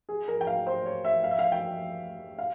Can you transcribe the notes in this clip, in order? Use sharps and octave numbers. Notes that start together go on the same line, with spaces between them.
G#4
A#4
G5
F5
C5
C#5
E5
F5
E5
F5
G5
F5